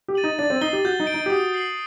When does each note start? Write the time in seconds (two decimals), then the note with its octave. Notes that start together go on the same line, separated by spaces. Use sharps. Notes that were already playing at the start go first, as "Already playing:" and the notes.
0.08 G4
0.15 A6 D#7 F#7
0.24 D#4
0.39 D4 A6
0.50 C4
0.61 D#4 C7 G7
0.73 G4
0.85 F#4 G6
1.00 D#4
1.07 D7 G7
1.14 D#4
1.26 G4
1.30 F#4 D#6
1.52 G6 C7 F#7